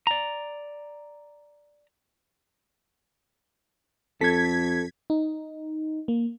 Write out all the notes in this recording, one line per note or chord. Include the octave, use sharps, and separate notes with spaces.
D5 A#5
F2 A4 G#6 B6
D#4
A#3